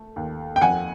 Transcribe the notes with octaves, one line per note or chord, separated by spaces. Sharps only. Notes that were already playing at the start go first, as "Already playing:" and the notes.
Already playing: A3
D#2
G5
F2 F#5 G#5